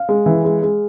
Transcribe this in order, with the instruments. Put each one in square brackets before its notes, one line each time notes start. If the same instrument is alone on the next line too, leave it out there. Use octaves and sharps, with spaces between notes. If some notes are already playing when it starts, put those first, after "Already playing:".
Already playing: [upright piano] F5
G#3
E3
G#3
G#3